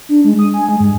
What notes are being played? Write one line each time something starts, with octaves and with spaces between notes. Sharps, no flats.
D4
G#3
D#6
G#5
G#3
G2